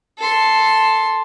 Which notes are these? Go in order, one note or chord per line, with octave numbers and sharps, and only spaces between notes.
A4 C6